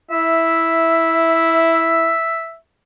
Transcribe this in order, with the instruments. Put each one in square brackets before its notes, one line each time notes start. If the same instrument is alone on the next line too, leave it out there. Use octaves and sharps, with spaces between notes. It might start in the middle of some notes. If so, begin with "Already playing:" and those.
[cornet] E4 [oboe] E5